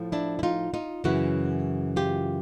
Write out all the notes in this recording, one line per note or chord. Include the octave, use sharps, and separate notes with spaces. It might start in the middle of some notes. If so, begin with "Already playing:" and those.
Already playing: A2 F3
D4 E4
E4
D#4 F4
D#4 F4
F#2 C#3 E3 E4 F#4
F4 G4